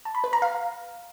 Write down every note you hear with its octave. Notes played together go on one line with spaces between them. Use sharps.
A5
B5
B4
A#5
F5